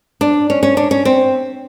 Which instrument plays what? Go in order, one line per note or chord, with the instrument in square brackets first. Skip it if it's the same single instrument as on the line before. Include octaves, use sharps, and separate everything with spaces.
[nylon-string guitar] D4
C#4
C#4
D4
C#4
C4